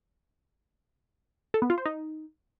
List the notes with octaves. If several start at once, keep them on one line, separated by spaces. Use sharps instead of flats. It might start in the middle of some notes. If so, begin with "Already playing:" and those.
A4
B3
F4
C5
D#4